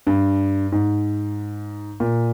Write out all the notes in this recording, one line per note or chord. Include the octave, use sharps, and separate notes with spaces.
G2
G#2
A#2